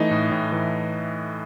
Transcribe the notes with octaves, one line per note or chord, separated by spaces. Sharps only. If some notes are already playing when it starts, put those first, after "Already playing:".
Already playing: E3 A3 D#4
A2
A2
E3